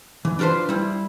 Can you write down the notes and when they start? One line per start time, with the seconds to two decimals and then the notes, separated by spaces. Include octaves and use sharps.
0.25 E3
0.39 D4 F4 A4 B4 C5
0.69 G3 E4